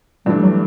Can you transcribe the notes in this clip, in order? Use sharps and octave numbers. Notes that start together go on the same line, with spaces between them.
G2 E3 G3 A3 D4
F#3